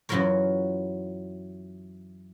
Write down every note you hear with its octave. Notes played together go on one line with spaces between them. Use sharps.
F#2 E3 F#3 F4 A#4 C#5